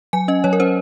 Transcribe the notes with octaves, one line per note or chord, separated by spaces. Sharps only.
F#3 G#5
C#4 D#5
F#3 C#5
A#4
C#4 C5